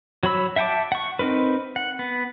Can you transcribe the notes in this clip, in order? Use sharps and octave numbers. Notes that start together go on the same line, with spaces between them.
F#3 C#5 B5 E6
E5 F#5 G5 A5 D6
F#5 C#6
C4 D#4 A#4 B4
F#5
B3